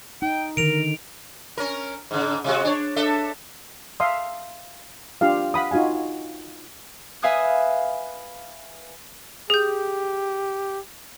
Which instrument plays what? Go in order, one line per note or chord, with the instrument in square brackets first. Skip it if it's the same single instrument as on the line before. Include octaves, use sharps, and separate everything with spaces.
[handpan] D#4 [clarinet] G5
[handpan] D3 D#3 [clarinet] A#4 [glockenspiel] D7 F7
[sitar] C#4 A#4
G#2 C#3
C3 G#3 F#4
D4 C#5
D4 A4 E5
[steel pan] E5 F5 A5 C6 D#6
D4 F4 G4 F5
F5 F#5 B5 D#6
D#4 F4 F#4 F5 G#5
[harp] B4 E5 F5 G#5 D#6 F#6
[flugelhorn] G4 [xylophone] G#4 G6